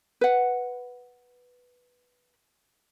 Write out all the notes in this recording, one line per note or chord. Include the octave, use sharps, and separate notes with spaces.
B4 F#5